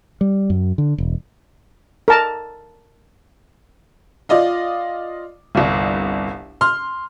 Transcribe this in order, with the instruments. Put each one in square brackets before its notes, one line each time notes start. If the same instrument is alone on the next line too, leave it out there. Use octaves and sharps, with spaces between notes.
[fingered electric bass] G3
F#2
D3
E1
[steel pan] A#4 A5
[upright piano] F4 D5 D#5 F5
G1 C2
C6 F6